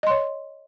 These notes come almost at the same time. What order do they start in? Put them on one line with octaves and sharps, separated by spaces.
D#5 C6 C#5